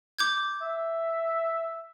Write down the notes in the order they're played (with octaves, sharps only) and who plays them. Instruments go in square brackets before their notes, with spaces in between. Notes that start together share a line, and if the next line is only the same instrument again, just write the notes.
[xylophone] D6 G6 G#6
[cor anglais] E5